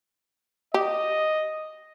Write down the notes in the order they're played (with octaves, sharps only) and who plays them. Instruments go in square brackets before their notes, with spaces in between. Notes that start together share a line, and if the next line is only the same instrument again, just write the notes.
[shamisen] G4 [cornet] D#5